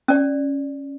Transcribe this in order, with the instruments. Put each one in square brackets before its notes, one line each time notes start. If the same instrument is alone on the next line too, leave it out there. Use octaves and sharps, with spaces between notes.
[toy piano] C#4 D5